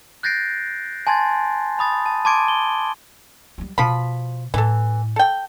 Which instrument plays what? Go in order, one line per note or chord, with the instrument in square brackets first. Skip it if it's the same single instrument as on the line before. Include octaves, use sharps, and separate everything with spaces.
[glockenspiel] F#6 G6 A6 A#6 C7 D7
G#5 A5 C6 G#6 A6
A5 B5 D#6 A6
A5
A5 C6 D6 G#6 D7 D#7
G7
[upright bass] F#3 G3
[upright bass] B2 [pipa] F3 B5
[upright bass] A2 [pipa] E3 A4
[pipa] A4 G5